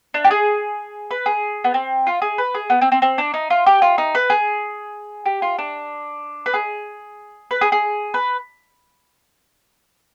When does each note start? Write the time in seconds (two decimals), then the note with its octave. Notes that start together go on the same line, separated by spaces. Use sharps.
0.14 D4
0.24 G4
0.31 G#4
1.11 B4
1.26 G#4
1.64 B3
1.74 C4
2.07 F4
2.22 G#4
2.38 B4
2.55 G#4
2.70 B3
2.81 C4
2.92 C4
3.02 C4
3.18 D4
3.34 D#4
3.50 F4
3.66 G4
3.82 F4
3.98 D#4
4.15 B4
4.30 G#4
5.26 G4
5.42 F4
5.59 D4
6.46 B4
6.54 G#4
7.51 B4
7.61 G#4
7.72 G#4
8.14 B4